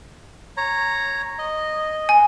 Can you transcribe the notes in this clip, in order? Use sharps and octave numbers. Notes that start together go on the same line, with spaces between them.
C#5 A#5
D#5
G#5